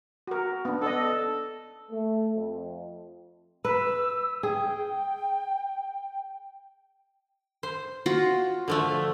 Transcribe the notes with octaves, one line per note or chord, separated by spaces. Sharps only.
F#4 A#4
B3 D4
D4 A4 D#5
A3
F2
B4 E6
G#4 G5
C5
F4 F#4
D3 F3 A3